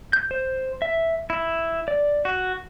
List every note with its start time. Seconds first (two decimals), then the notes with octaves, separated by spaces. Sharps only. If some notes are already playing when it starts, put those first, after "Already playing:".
0.13 G6
0.31 C5
0.82 E5
1.30 E4
1.88 D5
2.25 F#4